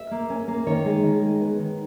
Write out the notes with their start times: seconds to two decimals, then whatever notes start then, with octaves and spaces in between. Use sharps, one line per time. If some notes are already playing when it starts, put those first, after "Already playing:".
Already playing: E5
0.11 A#3
0.30 C#4
0.48 A#3
0.67 D#3 C#5
0.85 G#3
1.04 D#3
1.22 G#3
1.41 B3
1.59 D#3